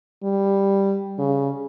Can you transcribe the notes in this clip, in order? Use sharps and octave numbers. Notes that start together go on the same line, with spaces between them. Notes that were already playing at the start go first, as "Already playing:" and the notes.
G3
C#3